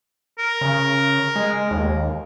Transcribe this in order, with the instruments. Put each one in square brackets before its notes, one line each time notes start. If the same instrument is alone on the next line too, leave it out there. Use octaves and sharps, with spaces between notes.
[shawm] A#4
[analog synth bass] C#3
G#3
D#2